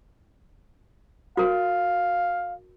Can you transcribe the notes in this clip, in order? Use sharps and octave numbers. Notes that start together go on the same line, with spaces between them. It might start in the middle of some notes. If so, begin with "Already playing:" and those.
F#4 A#4 F5